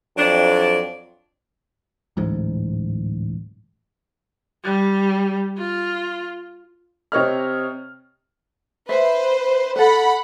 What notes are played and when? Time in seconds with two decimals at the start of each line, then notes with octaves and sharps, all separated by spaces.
0.17 F2 F#3 D4
2.17 D1 A1 G#2
4.64 G3
5.58 F4
7.12 C3 C#5 D#5 F6
8.89 B4 C5 E5
9.76 A4 B4 F#5 B5